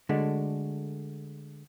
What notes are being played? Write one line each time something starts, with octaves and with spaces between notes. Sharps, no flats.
D3 G#3 A3 D4 F#4